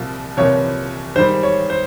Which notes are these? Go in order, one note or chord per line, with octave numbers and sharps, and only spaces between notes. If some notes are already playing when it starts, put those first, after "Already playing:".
Already playing: C2 A#2 F3
C2 A#2 F3 C#5
G#2 D#3 G3 C5
C#5
C5